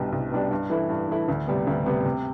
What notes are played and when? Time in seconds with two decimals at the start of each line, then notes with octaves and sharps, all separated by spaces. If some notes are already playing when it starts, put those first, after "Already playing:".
Already playing: C2 B2 G3 D4
0.12 C2
0.31 B2 G3 D4
0.51 G2
0.70 E3 A3 E4
0.89 G2
1.08 E3 A3 E4
1.28 D2
1.47 C3 G3 B3
1.67 D2
1.86 C3 G3 B3
2.05 C3